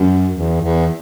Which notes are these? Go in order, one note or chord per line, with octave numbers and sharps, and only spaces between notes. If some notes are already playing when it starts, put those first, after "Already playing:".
Already playing: F#2
E2
E2